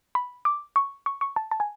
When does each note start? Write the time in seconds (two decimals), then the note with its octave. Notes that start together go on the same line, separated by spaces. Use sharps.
0.15 B5
0.45 D6
0.76 C#6
1.06 C#6
1.21 C#6
1.36 A5
1.51 A5
1.60 G#5